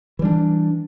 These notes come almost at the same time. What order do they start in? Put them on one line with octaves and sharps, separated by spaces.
E3 G3 D4